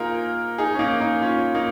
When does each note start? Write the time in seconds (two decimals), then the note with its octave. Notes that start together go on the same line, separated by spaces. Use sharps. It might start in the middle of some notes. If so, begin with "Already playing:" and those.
Already playing: A#3 D#4 F4 G#4 A#4
0.58 D#4 G#4
0.74 C#4
0.79 A#3 D#4
1.00 A#3 D#4
1.22 C#4 F4
1.55 A#3 D#4